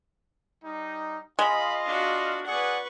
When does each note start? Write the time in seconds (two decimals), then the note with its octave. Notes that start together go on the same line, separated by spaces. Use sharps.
0.63 G3 D#4
1.39 G#3 F4 D#5 F5 B5
1.85 D4 F#4
2.46 G#4 B4 D5 F#5 C#6